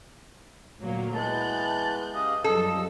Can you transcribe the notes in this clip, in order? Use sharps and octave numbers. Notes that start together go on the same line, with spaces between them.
D2 A#2 F#3 A#3
E3 G#3 B3 A5 F#6 G6
C#3 G4 D#5 F5
F#2 F3 G3 A4 D#5